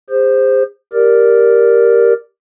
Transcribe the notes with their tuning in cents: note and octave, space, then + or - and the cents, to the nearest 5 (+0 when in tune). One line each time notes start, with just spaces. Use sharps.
G#4 -45 C5 +0
G4 +0 A#4 +0 D5 +0